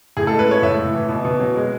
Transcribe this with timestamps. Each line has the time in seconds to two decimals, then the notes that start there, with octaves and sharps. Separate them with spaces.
0.17 A2 G#4
0.27 A4
0.31 G#3
0.39 B4
0.48 G#3 C#5
0.62 A2 E5
0.79 A2
0.94 E3
1.09 B2
1.25 B2
1.40 F#3
1.56 G#3